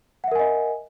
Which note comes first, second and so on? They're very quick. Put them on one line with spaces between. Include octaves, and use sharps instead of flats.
F#5 E5 A#4 G#5 D#5